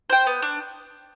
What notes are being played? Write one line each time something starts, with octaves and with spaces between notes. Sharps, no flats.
C5 G5
B3
D4